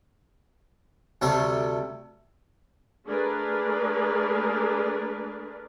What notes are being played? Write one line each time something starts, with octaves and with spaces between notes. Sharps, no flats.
D2 C3 G3 A3 A4 C6
A3 D4 G#4 A#4 B4 D5